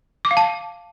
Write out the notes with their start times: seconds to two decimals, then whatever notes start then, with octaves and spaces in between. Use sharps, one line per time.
0.25 D6
0.31 F5
0.37 A5